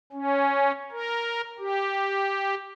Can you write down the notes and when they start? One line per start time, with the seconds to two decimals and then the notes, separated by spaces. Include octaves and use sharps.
0.13 C#4
0.91 A#4
1.59 G4